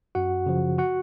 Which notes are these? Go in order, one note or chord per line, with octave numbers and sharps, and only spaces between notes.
F#2 F#4 F#5
C#3 F3
F#4 F#5